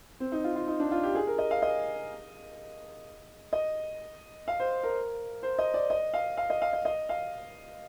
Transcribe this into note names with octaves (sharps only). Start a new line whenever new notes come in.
C4
D#4
F4
F4
D#4
D4
F4
G4
G#4
A#4
D#5
F5
D#5
D#5
F5
C5
A#4
C5
D#5
D5
D#5
F5
F5
D#5
F5
D#5
D#5
F5